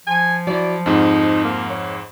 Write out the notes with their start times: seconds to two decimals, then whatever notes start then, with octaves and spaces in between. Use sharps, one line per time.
0.07 F3 G#5
0.47 F#3 E4 D5
0.86 F2 G#2 D#4
1.44 A#3
1.70 C#5